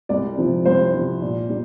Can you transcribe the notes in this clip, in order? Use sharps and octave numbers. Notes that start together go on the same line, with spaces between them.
C2 D5
C3 F3
C2 C5
C3 F3
A#2
G3